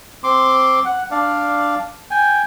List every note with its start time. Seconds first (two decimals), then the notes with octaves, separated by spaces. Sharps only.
0.24 C4 C6 D6
0.85 F#5
1.11 D4 D5 F5
2.11 G5 G#5